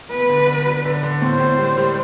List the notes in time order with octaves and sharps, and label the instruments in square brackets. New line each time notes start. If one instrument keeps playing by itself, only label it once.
[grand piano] B3 [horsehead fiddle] B4
[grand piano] D3
D3
F#3
D3
D3
[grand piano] A2 [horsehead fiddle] C5
[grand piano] A2
G3
G3